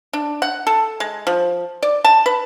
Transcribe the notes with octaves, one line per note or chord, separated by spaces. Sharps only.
D4
F#5
A4
G#3
F3
D5
A5
B4